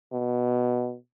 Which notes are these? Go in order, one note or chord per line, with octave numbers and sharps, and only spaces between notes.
B2